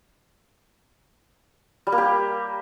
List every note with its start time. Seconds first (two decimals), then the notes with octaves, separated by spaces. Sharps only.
1.87 G3
1.92 A#3
1.98 G4